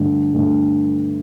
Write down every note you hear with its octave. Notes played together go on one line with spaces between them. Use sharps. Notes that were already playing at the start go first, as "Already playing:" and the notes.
Already playing: G2 D3 A3
G2 D3 A3